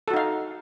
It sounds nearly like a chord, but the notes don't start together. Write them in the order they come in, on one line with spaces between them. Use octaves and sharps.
A4 F#4 D#4 F5